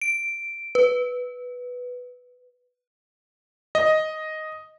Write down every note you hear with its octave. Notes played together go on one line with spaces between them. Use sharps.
D7
B4
D#5